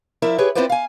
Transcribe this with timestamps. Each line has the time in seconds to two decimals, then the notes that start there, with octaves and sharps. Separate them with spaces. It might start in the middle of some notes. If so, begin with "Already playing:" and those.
0.22 F3 E4 A#4 D5 E5
0.38 G4 G#4 B4 C#5
0.55 C4 E4 F4 B4 C5 D5
0.70 F5 G#5